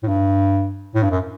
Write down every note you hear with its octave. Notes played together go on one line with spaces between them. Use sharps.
A2
G2
A2
G2
F#2